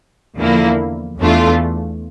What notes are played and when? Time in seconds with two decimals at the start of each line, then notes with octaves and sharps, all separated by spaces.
0.37 E2 D3 F3 A#3 E4
1.19 E2 E3 A3 D4 F4